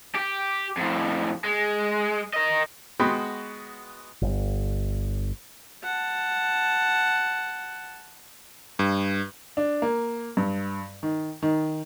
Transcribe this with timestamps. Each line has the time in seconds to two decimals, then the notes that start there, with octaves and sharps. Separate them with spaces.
0.15 G4
0.77 F2 A2
1.44 G#3
2.33 A#4 D#5
3.00 G#3 B3 F#4 G5 B5 C6
4.22 G1
5.84 F#5 A5
8.79 G2
9.57 D4
9.82 A#3
10.37 G2
11.03 D#3
11.42 D#3